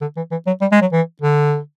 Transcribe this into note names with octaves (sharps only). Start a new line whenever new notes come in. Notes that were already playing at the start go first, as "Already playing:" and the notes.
D3
E3
E3
F#3
G3
G#3
F#3
E3
D3